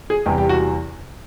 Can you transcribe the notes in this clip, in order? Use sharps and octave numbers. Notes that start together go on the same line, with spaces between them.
G#4
E2 C3 E3 G3 G4
G4
F#4